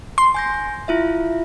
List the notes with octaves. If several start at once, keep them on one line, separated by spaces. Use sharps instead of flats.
C6
G#5 G6 A#6
E4 F4 E5